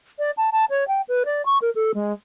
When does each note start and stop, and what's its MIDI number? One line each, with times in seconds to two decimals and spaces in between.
0.19 0.31 74
0.37 0.50 81
0.52 0.65 81
0.70 0.86 73
0.87 1.01 79
1.08 1.23 71
1.25 1.44 74
1.45 1.58 85
1.61 1.70 70
1.75 1.91 69
1.94 2.13 56